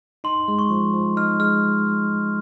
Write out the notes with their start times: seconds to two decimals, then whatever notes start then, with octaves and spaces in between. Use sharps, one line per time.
0.24 D#4 C6
0.48 G#3
0.59 C#6
0.70 F3
0.94 F3
1.17 D#4 F6
1.39 G#3 F6